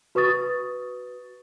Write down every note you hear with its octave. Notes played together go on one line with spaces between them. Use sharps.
F#4 B4 C#6 D#6 A6